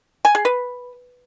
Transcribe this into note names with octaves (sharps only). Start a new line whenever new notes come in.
G#5
G#4
B4